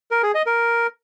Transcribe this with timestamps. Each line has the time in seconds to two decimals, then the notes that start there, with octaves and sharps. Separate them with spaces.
0.11 A#4
0.23 G#4
0.35 D#5
0.46 A#4